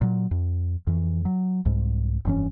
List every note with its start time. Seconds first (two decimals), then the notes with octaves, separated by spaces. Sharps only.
0.01 A#2 F#3
0.31 F2
0.87 F2 E3
1.25 F#3
1.65 C2 G#2
2.25 F1 G2 E3 C#4